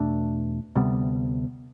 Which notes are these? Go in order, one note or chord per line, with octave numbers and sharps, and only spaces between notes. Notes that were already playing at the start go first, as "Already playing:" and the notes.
Already playing: E2 B2 A3 D4
D2 C3 G3 B3